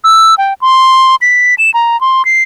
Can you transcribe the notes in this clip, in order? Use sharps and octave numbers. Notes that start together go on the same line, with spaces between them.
E6
G5
C6
B6
E7
A#5
C6
C7